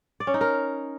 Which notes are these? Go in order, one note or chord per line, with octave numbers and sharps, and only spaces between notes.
D5
C#4
D#4
A#4